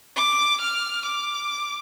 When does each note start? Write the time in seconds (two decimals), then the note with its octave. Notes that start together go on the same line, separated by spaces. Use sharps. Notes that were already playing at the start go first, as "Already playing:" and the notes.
0.16 D6
0.61 F6
1.05 D6